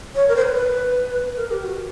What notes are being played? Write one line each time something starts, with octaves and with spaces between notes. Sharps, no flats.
C#5
A#4
C5
B4
B4
A#4
G4
F#4